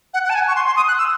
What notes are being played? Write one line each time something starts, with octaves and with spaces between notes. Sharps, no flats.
F#5
F#5
A5
G#5
C#6
C6
C6
D#6
F#6
E6